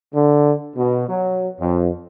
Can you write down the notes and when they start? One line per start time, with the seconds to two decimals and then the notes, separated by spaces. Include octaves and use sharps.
0.14 D3
0.76 B2
1.09 F#3
1.60 F2